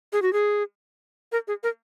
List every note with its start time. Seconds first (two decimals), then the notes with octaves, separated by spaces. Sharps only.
0.13 G#4
0.22 F#4
0.33 G#4
1.32 A#4
1.48 G#4
1.63 A#4